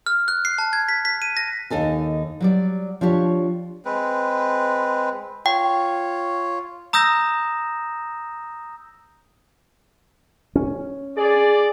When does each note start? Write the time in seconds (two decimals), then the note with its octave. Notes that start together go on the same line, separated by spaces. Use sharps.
0.06 F6
0.28 F#6
0.45 C7
0.58 A5
0.73 G#6
0.89 B6
1.05 B6
1.22 D#7
1.37 A#6
1.70 D#2 D#4 A4 G#5
2.41 F#3 G3 D5
3.01 F3 D4 G4 C#5
3.85 G#3 C4 B4
5.46 F4 C#5 G5
6.93 A#5 D#6 E6 G6 A#6 E7
10.55 C#4
11.18 G#4 D5